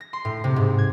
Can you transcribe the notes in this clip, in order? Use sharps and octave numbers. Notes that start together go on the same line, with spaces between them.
A#6
C6
A2
C3
G#2
G#6